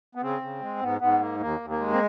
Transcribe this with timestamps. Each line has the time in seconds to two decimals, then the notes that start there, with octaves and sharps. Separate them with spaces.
0.15 B3
0.22 C#3 C4
0.42 C#3
0.61 G#3
0.81 G#2 B3
1.00 G#2 B3
1.21 A#3
1.40 D#2 A#3
1.60 D#2
1.70 A#3
1.79 G#3
1.93 C4